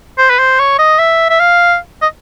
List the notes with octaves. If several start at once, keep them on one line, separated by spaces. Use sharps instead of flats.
C5
B4
C5
C#5
D#5
E5
E5
F5
D#5